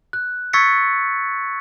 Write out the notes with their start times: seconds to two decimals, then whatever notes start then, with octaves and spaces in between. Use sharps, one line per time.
0.13 F#6
0.53 C#6 E6 G#6 A6 B6 C#7